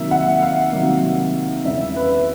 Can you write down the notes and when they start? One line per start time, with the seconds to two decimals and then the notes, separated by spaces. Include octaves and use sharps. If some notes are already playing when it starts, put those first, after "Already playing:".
Already playing: C3 D#3 F#3 A#3 E5
0.11 F#5
0.42 F5
0.73 C3 D#3 F#3 A#3
1.65 E2 C#3 E3 E5
1.96 B4